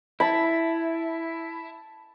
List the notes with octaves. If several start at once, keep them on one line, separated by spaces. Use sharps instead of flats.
E4 A5 B5